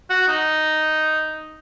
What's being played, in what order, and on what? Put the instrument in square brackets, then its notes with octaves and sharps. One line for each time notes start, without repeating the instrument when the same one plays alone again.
[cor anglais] F#4
D#4